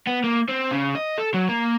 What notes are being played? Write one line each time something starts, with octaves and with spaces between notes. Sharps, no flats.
B3
A#3
C4
C#3
D#5
A4
F#3
A#3